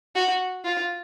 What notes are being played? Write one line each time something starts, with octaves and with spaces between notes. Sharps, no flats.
F#4
F4